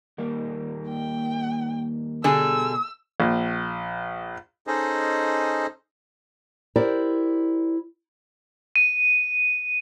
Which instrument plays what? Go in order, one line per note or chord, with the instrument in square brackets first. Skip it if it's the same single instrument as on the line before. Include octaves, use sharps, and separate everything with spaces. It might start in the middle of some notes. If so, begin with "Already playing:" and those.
[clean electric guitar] D#2 G3 A#3
[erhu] G5
[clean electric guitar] B2 [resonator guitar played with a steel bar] D3 G3 G#4 [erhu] E6
[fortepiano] A#1
[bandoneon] C#4 D#4 G#4 A4 C5 D#5
[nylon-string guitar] E4 G4 A#4 C5 D5
[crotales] D#7